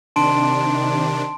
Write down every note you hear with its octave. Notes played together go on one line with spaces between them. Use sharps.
C3 D#3 D4 A5 C6 D7